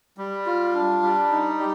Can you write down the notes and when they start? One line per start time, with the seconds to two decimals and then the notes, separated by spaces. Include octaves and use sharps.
0.18 G3
0.46 F4
0.74 D4
1.02 G3
1.30 D#4
1.59 G4